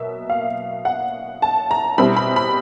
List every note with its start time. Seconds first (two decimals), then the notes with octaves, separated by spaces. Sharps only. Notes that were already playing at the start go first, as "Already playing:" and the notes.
Already playing: B2 F#3 A#3 E5
0.30 F5
0.85 F#5
1.42 A5
1.71 A#5
1.98 B2 G3 C4 E4 B5
2.16 B5
2.36 B5